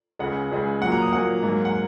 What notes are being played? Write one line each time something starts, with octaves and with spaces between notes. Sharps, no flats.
C#2 C#3 G#3 F#5
C#2 C#3 G#3
A#2 F#3 A#3 F#5
A#5
D#6
A#2 F#3 A#3 F#5
G#2 F#3 A#3
F#5